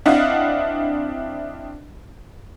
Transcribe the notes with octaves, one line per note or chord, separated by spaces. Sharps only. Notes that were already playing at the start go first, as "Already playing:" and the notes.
C4 D4 E4 D#5 F5 F#5